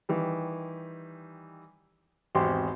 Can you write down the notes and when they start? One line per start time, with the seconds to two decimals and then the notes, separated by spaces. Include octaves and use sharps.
0.09 D#3 E3 G3
2.35 G#1 E2 C4 F#4 G4 C6